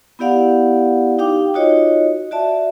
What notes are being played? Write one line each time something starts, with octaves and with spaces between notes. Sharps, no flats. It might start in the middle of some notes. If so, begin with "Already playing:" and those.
B3 E4 G4 D5 F5 F#5
D#4 G4 F5 G5 D6
D#4 F4 F#4 C#5 D#5
F#4 D5 E5 A5